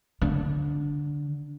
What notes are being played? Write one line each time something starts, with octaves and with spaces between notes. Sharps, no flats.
D3